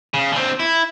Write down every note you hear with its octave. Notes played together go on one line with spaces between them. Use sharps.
C#3
D3 C4
E4